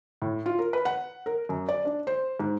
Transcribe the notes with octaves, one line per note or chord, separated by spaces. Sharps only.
A2
F4
A#4
B4
F#5
A#4
F#2
D5
D4
C5
G#2